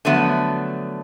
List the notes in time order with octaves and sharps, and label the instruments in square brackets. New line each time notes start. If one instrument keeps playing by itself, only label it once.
[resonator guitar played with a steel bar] D3 F3 F#3 A3 B3